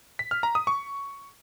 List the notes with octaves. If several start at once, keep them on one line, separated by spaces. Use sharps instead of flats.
B6
F6
A#5
D#6
C#6